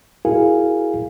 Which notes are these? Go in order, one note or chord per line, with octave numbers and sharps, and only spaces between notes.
E4 F#4 G#4 A#4 F5 G#5